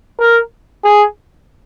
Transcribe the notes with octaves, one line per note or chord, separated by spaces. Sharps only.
A#4
G#4